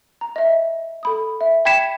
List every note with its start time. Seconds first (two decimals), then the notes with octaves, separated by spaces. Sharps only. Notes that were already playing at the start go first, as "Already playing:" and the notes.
0.21 A#5
0.36 D#5 E5
1.03 A4 B5 D#6
1.41 E5
1.65 G5 B5 G#6 B6 C#7 E7